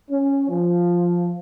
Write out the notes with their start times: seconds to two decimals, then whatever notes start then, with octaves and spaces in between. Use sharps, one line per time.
0.11 C#4
0.49 F3